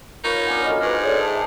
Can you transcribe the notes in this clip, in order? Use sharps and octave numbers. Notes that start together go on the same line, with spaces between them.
D#4 F4 A#4 B4 C#5
B3 C#4 D4
D4 F#4 A4 A#4 D#5 F5 F6
G#2 B4 C#6
G#4 A4 C#5 D5 D#6
E5 A5